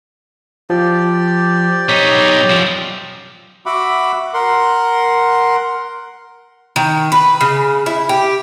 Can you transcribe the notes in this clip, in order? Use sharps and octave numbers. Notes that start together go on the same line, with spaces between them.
F3 G4 D5
B1 D#4 C#5 B6
F#2 F3
F#4 E5 F#5 B5 D6
A#4 F#5 C6
D#3
B4
C#3
E4
G4